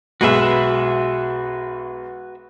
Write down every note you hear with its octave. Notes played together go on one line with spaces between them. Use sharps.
B1 G#3 F#4 B4 E5